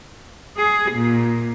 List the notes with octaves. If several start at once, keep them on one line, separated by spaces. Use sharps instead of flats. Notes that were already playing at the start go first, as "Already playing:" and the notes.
G#4
A#2